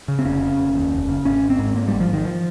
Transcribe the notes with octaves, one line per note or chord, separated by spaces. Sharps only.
C#3
C4
F1 C#4
C#3
F1
D#2
F1
C#3
G#1 C#4
G#1
C4
G#2
G#2 A#3
G#1 G3
F3
G#1 D#3
F3